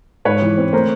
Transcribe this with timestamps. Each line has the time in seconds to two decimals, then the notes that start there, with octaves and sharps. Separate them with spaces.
0.25 G#2 B4 C#5
0.42 E3
0.58 C4
0.73 A3 A#4 C5